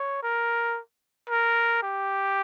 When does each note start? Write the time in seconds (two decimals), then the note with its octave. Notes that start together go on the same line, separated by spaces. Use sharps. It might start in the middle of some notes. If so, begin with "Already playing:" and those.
Already playing: C#5
0.23 A#4
1.29 A#4
1.82 G4